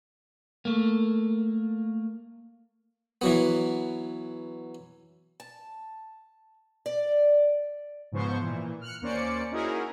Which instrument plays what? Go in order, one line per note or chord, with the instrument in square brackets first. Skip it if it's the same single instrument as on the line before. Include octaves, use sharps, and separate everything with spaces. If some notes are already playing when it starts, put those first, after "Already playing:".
[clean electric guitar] A3 A#3
[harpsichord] E3 F#3 B3
[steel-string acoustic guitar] A5
D5
[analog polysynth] G#2 C#3 F3 B3 C5 C#6
A#2 E3
F6 F#6 C#7
D#2 A#3 C#4 C5 D5 C#7
C#4 D#4 E4 F#4 G#4 A#4